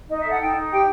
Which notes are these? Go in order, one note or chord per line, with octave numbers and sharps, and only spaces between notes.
D#4 D#5
A4 E5
F#5
D#4 G5
D#4
G4 G5